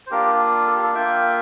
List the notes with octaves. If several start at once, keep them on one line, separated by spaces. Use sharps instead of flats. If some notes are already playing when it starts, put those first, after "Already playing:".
C5
A#3 D4 F4 G4 A#4
A4
G4
A4
A#3 F4 E5 G5